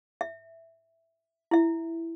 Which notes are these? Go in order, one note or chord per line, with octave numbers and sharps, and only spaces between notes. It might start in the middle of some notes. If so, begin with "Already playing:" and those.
E5
E4 E5